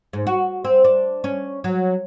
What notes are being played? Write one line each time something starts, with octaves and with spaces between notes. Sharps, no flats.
G#2
F#4
C4
D4
C#4
F#3